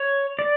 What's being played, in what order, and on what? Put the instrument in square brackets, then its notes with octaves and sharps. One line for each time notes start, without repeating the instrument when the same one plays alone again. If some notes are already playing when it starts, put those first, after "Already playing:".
Already playing: [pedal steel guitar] C#5
D5